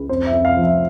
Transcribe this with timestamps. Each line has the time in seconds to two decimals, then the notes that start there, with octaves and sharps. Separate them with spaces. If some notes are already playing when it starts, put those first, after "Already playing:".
Already playing: C#2
0.09 F2 C5
0.27 E5
0.32 F2
0.45 F5
0.57 F3
0.63 E5